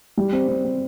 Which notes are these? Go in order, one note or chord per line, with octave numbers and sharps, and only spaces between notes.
G3
C4
C4
C4